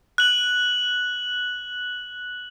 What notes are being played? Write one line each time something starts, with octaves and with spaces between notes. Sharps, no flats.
F#6 F#7